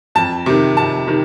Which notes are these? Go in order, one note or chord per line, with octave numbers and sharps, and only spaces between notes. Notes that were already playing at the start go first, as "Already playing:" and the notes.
F2 A5
C3 D#3
F2 A5
C3 D#3